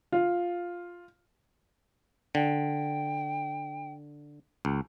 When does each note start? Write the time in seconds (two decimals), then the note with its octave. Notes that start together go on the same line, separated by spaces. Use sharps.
0.12 F4
2.35 D3 G5
4.65 C#2